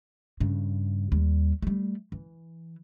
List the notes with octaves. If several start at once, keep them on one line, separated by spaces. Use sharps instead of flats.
G2 C#3
D#2 G3
G3 A3
E3